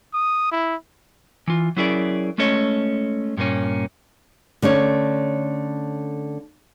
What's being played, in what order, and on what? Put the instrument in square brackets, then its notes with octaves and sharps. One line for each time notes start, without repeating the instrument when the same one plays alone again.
[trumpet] D#6
E4
[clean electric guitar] E3 F4
F#3 C#4 E4 G#4 A#4 D5
G#3 A3 C#4 A4 C#5 D#5
G2 A#2 A#3 C#4
[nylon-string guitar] D3 A3 C#4 C#5